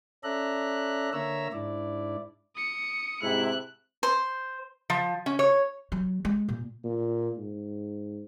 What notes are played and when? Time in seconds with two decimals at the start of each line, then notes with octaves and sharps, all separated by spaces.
0.24 C#4 A4 D5 E5 A#5 F#6
1.13 D3 A#3 C#5 E5 A#5 E6
1.53 G#2 D4 E4 D5
2.56 D#6 C#7
3.22 G#2 C3 E4 F#6
4.03 C5
4.90 F3
5.26 C#4
5.39 C#5
5.92 F#3
6.25 G#3
6.49 A#2
6.84 A#2
7.38 G#2